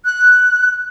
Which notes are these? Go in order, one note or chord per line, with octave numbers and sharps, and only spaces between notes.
F#6